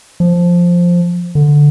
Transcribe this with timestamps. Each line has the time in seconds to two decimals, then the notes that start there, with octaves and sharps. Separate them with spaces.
0.20 F3
1.35 D3